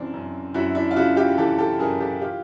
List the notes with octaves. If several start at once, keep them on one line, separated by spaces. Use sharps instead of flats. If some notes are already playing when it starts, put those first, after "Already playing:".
Already playing: F#2 C#3 E3 C4 D4
F#2
F#2 E4 F#4
D4 E4
F4
C#3 E4 F#4
F4 G4
E3 G4 A4
G4 A4
F#2 G#4 A#4
G4 A4
F4 G4